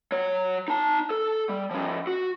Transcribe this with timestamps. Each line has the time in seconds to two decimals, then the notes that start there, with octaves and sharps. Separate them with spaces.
0.12 F#3 C#5
0.68 D#4 A5
1.10 A4
1.49 G3
1.71 F3 C#4
2.07 F#4